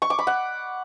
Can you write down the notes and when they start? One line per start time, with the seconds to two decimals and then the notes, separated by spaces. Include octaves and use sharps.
0.02 C#6
0.10 D6
0.19 B5
0.27 F#5